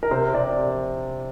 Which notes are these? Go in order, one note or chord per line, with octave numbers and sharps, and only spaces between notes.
A#4
C3 C5
C3 D5